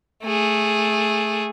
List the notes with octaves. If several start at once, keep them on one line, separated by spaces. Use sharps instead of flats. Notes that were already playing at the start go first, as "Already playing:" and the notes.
A3 G#4